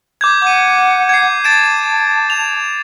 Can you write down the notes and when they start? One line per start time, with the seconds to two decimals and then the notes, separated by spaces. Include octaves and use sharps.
0.21 D6 G6 G#6
0.42 F#5 D6 D#7
1.09 G#6 C7
1.44 A5 A6 D7 E7
2.30 F7